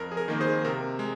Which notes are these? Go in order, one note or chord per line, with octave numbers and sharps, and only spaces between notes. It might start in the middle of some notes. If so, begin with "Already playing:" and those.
Already playing: F2 A#4
G#4
A#4
D#3 A#3 D#4
G#4 C5
C3 A#4
G#3